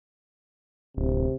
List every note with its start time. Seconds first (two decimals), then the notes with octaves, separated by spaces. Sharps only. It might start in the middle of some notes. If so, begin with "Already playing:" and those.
0.97 D1 C3